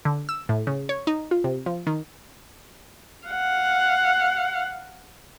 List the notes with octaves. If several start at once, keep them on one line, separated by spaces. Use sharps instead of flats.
D3
E6
A2
C#3
C#5
D#4
F4
C3
F3
D#3
F5 F#5